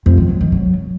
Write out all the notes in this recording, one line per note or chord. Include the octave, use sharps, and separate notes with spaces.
F2
D#3
F#3
D#3
F#3